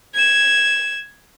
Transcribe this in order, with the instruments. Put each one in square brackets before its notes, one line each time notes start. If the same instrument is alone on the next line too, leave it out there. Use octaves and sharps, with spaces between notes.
[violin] G#6 E7